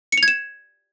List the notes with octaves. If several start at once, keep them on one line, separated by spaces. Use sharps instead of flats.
C#7
F7
G#6
E7